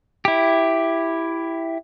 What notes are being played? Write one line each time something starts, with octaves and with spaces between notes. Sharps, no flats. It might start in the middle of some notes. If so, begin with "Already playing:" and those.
E4 G4